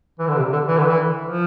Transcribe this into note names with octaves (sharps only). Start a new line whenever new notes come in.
E3
D3
C3
D3
E3
D3
E3
F3